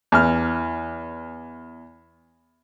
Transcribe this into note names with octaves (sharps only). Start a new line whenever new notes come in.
E2 F6